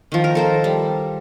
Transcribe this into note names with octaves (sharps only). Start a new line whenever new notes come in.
D#3 F3
A#4
A4 A#4 C5
G3